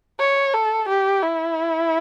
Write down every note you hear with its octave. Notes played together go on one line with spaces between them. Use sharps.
C#5
A4
G4
E4